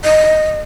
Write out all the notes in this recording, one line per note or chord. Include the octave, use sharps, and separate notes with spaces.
D#5